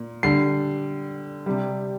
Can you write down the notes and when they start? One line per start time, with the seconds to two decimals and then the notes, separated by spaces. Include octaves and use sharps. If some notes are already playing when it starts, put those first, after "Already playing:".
Already playing: A#2
0.23 D3 G3 C7
1.46 C3 G3